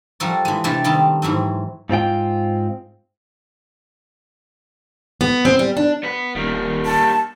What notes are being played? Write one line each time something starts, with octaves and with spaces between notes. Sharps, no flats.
F3 G3 F#4 A4 A#4
E3 G#3
C3 A3 D4 E4 D5 F5
D#3 G3 B3 C4 A5
G#2 E3 F#3 C4
G#2 C4 F4 G5
B3
C4
G3
D4
B3 B4
D#1 G3 A#3
A5